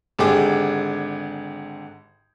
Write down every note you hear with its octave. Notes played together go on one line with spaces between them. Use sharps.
G#1 D3 G4 G#4 D6